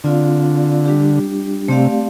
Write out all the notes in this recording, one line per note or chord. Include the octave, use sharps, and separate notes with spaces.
D3 C4 F4 D5 F5
G3 D4 G4
C3 A3 C4 G4 D5 F5